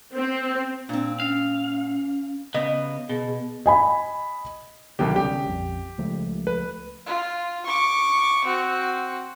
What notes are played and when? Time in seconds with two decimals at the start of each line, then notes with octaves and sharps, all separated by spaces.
0.16 C4
0.89 A#2 C4 D4
1.20 C#4 F5
2.54 C#3 B3 D#5
3.09 B2 G#4
3.66 D#5 G#5 B5
4.99 C2 B2 D3 D#3 F#3 G4
5.16 C#3 G3 C#4 G4
5.45 A#1 F2
5.98 C#2 F3 A3
6.47 B4
7.06 F4
7.66 C#6 D6
8.45 C4 F#4